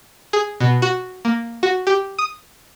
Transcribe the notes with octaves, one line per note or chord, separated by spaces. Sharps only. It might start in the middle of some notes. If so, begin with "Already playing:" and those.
G#4
B2
F#4
A#3
F#4
G4
D#6